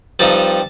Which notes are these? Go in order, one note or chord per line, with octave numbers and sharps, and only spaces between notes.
G2 F3 C4 D#4 A5